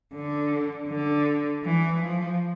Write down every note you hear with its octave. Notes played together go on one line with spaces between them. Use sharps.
D3
D3
E3
F3